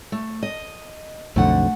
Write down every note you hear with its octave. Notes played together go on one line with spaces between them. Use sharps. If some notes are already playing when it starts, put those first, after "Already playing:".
A3
D#5
B1 F2 D3 A3 F#5